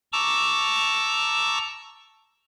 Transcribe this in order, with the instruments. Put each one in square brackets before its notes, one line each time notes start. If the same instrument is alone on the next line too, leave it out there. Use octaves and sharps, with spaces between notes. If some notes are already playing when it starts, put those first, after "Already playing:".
[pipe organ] A5 A#5 C#6 D6 E6